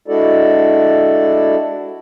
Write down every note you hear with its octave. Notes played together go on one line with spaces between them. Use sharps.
G#3 D4 E4 F#4 A4 D5